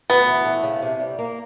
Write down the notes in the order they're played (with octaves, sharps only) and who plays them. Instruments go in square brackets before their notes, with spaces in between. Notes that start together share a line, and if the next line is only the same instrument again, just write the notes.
[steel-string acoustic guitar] D2 [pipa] B3
[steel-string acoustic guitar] E3
A3
C#3
C3
G3
A#3